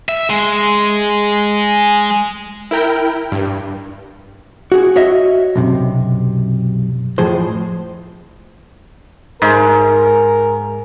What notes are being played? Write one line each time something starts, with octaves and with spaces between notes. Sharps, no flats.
E5
G#3
E4 A#4 G5
G2
F#4 G#4
F#4 C#5 D#5 E5
B1 F#2 C3
F2 A2 F3 G#4 C5
G#2 A#4